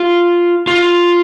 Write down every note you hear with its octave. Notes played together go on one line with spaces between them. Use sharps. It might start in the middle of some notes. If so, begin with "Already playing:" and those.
Already playing: F4
F4